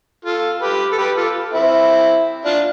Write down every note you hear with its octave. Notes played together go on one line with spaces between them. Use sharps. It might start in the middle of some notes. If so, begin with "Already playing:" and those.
F4 A4
G4 B4
A4
G4 B4
F4 A4
C4 E4
D4 F4